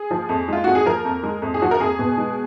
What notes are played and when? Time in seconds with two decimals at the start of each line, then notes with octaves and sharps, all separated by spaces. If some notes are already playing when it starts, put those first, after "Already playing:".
Already playing: G#4
0.11 F3
0.29 F2
0.48 G#3 F4
0.64 F2 F#4
0.75 G#4
0.86 F3 A#4
1.05 F2
1.23 G#3
1.42 F2
1.54 G#4
1.62 F3 F#4
1.71 A#4
1.80 F2 G#4
1.99 B2
2.18 G#3